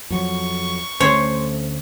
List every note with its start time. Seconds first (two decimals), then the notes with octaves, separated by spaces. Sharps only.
0.10 F2 F#3 C#6
1.00 D2 A3 C#4 C5 C#5